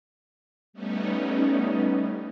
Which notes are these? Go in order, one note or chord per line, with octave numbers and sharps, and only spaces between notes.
G3 A3 B3 C#4 D#4